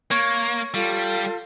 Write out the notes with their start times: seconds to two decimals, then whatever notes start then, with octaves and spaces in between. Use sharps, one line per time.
0.11 A#3 C#5
0.74 G3 F4 A4 F5